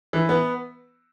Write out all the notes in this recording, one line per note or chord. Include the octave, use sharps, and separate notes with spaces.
E3
B3